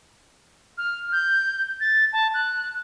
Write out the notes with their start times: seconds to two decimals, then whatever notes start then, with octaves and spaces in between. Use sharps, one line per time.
0.78 F6
1.12 G6
1.80 A6
2.13 A5
2.34 F#6